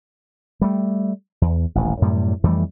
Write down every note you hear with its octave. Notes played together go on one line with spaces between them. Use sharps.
G3 A3
E2
D#1 A1
F#2 A2 C3 G3
F2 E3 G3 A3